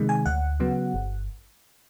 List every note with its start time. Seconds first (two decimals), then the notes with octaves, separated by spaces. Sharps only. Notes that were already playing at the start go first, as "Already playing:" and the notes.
Already playing: C3 D#3 G#3
0.09 G#5
0.26 D2 F#5
0.60 C#3 F#3 B3
0.94 G1